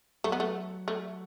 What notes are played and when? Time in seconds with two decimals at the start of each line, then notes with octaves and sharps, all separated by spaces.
0.24 F#3 A3 F#4
0.32 B3
0.40 A3
0.88 A3